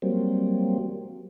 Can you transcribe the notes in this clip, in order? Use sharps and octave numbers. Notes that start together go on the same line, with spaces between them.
F#3 G3 A#3 C4